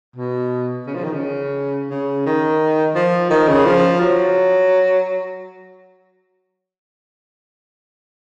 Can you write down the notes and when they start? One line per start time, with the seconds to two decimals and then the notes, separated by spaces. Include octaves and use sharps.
0.16 B2
0.87 C#3
0.95 F3
1.04 D#3
1.13 C#3
1.90 C#3
2.26 D#3
2.95 F3
3.30 D#3
3.48 C#3
3.66 F3
4.01 F#3